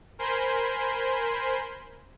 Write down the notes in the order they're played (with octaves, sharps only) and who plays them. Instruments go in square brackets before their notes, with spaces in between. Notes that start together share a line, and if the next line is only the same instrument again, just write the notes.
[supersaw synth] A#4 C5 G#5 B5 C6